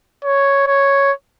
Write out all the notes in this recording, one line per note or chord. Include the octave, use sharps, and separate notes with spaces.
C#5
C#5